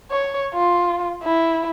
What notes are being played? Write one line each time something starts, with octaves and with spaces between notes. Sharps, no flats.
C#5
F4
E4